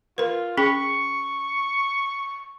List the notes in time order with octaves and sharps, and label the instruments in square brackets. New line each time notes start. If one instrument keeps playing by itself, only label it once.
[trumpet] F4 [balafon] A#4 B4
[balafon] C#4 G#4 G5 [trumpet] C#6